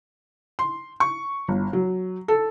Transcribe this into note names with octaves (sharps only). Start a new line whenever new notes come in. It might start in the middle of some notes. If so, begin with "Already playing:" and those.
C6
C#6
G1
F#3
A4